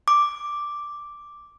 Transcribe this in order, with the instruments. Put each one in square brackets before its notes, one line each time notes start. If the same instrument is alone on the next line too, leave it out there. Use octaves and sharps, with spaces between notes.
[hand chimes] D6